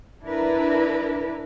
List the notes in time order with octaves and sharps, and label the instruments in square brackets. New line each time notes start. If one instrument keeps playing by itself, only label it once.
[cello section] D4 E4 A#4 B4